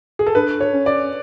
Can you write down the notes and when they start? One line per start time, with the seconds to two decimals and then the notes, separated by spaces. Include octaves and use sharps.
0.19 G#4
0.27 A4
0.35 D4 B4
0.61 C#5
0.73 C#4
0.86 D5